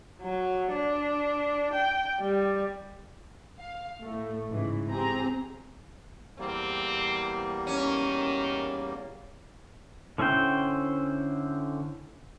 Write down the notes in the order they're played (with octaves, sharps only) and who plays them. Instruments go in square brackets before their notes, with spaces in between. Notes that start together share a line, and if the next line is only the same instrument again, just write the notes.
[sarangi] F#3
D4
G5
G3
[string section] F5
A2 A3
G#2 C#3 E3
C4 G4 G#4 A#5
[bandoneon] E2 G3 A#3 [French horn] C4
[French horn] D#3 [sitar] C#4
[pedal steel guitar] D3 C#4 E4 C5 G5